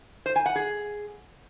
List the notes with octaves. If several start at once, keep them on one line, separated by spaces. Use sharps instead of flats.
C5
G#5
F#5
G#4